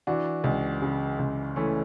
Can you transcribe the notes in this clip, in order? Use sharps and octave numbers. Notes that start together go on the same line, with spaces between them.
E3 D4 F#4
C#2
C#3
C#2
E3 A3 C#4